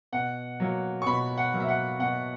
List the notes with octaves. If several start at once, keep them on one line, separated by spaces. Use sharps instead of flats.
B2 F#5
F#3 A#3
C#6
B2 B5
F#5
F#3 A#3
E5
F#5
B2 F#5